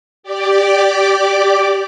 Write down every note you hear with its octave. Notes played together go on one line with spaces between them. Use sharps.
G4 D5 D6